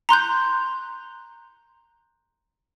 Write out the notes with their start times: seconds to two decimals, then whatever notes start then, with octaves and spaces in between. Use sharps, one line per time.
0.09 A#5 C6 F#6 G6